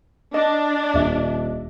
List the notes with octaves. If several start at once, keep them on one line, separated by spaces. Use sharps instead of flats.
D4 D#5
D#1 E5